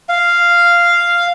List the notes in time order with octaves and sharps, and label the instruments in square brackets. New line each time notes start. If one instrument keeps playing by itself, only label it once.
[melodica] F5